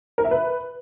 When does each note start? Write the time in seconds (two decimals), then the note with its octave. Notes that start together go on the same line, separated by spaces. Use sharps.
0.18 A#4
0.25 E5
0.31 B4